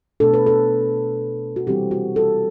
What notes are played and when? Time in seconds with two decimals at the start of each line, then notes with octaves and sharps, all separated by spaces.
0.20 B2 A3 D4 A4
0.34 B4
0.46 A4
1.56 F#4
1.67 C3 E3 G3 C4 E4 G4
1.91 F#4
2.16 A4